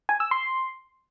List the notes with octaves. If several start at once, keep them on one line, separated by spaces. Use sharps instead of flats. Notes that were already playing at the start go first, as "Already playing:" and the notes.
G#5
E6
C6